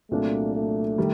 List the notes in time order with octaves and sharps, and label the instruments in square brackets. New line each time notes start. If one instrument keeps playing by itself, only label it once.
[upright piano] C2 A#2 F#3 A#3 D4 [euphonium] A3
[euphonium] A3
[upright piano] D#3 G3